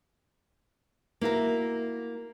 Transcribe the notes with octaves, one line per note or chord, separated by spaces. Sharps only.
A#3 E4 F#4 A#4